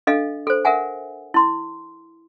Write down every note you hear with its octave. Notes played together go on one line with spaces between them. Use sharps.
D4 A4 D#5 F5
A4 C5
A#4 E5 F#5 G#5
E4 C6